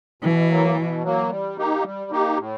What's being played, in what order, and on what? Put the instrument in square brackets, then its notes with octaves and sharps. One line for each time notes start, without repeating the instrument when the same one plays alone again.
[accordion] B2 [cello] E3
[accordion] F#3 A#3
B2
F#3 A#3
G3
A#3 D#4 G4
G3
A#3 D#4 G4
A2